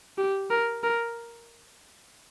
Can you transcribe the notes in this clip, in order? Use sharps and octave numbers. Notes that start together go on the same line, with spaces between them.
G4
A#4
A#4